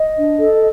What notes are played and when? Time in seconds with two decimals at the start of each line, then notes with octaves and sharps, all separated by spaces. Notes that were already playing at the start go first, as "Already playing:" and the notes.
Already playing: D#5
0.16 D4
0.40 A4